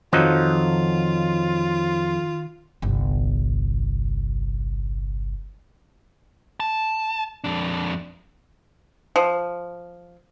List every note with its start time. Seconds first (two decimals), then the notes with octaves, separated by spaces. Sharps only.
0.13 F2 D#3 F3 F#3 D#4 F4
2.82 G1 C2
6.60 A5
7.44 F2 D4
9.16 F3